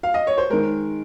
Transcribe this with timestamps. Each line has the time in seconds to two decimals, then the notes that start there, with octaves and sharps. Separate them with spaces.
0.03 F5
0.14 D#5
0.27 C#5
0.38 C5
0.50 D#3 G#3 A#4